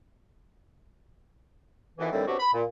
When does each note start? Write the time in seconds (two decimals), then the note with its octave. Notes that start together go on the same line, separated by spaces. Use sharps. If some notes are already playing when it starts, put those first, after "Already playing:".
1.98 F2 B2 D#3 E3
2.12 D#2 A2 D3 E3 G3 C4
2.27 B2 F#3 C4 D4 F#4 G4
2.40 B5
2.54 A#2